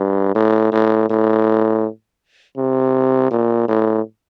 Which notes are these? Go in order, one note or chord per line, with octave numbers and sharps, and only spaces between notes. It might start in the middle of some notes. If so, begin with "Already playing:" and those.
Already playing: G2
A2
A2
A2
C3
A#2
A2